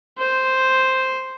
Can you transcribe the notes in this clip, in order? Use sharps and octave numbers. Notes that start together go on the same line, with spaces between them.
C5